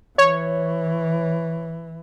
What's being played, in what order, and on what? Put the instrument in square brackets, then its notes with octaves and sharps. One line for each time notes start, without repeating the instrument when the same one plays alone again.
[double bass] E3 [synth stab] C#5